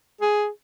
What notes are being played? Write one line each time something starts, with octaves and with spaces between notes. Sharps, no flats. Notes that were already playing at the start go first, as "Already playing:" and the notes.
G#4